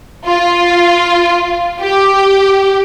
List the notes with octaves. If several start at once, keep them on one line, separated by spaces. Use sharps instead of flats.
F4
G4